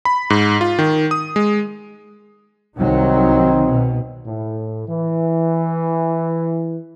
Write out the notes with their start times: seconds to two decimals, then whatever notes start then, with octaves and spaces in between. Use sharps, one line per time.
0.05 B5
0.30 G#2
0.61 F4
0.79 D#3
1.11 D#6
1.36 G#3
2.78 C2 D#3 F#3 C4 D#4
3.68 B2
4.27 A2
4.89 E3